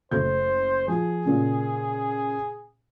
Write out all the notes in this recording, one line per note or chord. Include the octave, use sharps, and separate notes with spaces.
F#1 A3 C5 G6
F3 G#4
A#2 C#3